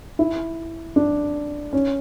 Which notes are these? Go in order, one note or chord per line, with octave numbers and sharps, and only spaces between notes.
E4
D4
C#4